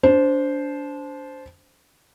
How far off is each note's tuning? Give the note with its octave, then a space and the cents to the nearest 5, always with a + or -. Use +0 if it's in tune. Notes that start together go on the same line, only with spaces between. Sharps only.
D4 -25 C5 -5